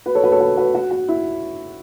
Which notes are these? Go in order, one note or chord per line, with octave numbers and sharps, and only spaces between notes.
F#4 B4
A4 C#5
F#4 B4
A4 C#5
F#4 B4
F#4 B4
F#4
F#4
E4